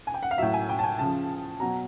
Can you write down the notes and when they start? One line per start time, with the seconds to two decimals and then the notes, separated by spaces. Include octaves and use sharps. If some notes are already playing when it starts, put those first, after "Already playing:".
0.07 G#5
0.14 G5
0.23 F#5
0.31 F5
0.38 A2 F#3 E5
0.54 G#5
0.69 G5
0.79 A5
0.84 G#5
0.99 C#3 F3 A5
1.60 B2 F#3 A#5